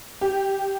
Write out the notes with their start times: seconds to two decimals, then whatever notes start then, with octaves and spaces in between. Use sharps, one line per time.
0.21 G4